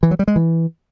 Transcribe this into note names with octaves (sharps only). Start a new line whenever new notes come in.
E3
F#3
G3
G#3
E3